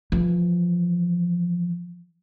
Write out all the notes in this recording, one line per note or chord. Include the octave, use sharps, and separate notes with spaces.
E3 F3